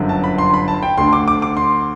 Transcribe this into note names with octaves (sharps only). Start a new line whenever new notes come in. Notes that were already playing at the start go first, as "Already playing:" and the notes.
Already playing: G1 F#2 D3
A5
B5
C6
B5
A5
G5
D2 D3 C6
D6
D6
D6
C6